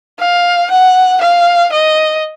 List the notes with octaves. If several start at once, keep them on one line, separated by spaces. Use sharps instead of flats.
F5
F#5
F5
D#5